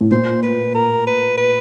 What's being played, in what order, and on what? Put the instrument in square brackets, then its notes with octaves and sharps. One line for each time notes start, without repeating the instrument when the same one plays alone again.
[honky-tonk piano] A2
[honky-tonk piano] A#2 [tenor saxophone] C5
[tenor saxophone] B4
A#4
B4
B4